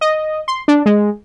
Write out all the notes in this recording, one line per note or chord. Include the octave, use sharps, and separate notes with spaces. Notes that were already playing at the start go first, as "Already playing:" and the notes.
D#5
C6
D4
G#3